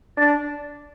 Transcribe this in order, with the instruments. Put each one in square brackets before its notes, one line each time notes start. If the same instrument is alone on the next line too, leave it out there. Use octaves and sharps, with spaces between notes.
[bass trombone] D4 [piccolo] A6